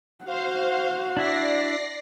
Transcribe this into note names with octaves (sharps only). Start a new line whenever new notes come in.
F#4 C5 F5
D4 E4 D5 E5 A#6 C7